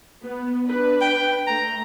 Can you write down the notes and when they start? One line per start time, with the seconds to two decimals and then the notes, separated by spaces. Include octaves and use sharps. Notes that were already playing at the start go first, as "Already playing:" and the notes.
0.24 B3
0.65 D4 B4
1.01 G5
1.47 A3 A#5